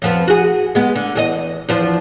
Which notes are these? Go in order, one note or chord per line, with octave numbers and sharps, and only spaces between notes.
F2 F3 B3
F#4 G#4
G#3 B3
D3
E2 G#4 D#5
E2 F3 D4